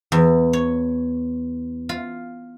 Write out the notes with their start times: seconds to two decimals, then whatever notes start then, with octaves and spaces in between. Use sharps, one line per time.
0.12 E2
0.53 C#5
1.89 F4